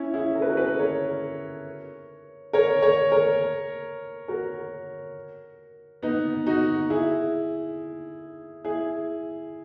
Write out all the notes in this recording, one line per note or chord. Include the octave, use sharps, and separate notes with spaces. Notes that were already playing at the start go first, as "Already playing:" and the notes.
Already playing: C#4 E4
E4 G#4
A#4
B4
F#4 A#4
G#4 B4
A#4 C#5
A#4 C#5
A#4 C#5
A#4 C#5
F#4 A#4
B3 D#4
D#4 F#4
E4 G#4
E4 G#4